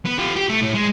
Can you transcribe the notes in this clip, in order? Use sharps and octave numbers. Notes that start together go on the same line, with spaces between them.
B3
F4 G4
G4
A3
A2
G#3